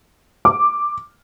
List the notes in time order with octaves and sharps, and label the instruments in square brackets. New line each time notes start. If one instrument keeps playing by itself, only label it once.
[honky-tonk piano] D6